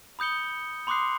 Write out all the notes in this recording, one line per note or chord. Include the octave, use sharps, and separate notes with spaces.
B5 D#6 G6 C#7 G7
B5 C6 D6 D#6 F#6 C7